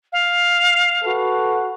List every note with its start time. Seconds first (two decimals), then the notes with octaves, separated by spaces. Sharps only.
0.12 F5
1.04 F#4 A4 B4